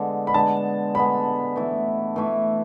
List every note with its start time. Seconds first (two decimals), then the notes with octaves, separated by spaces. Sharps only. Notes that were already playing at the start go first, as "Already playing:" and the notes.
Already playing: D3 G#3 B3
0.27 B5
0.34 D3 G#3 B3 A5
0.95 D3 G#3 B3 B5
1.56 E3 A3 E4
2.16 E3 A3 E4